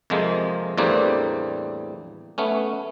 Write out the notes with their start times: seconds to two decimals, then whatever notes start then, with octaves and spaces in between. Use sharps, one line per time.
0.10 F2 C3 F3 G#3 A#3
0.78 E2 A2 G3 A#3 C4 D4
2.38 A3 B3 C#4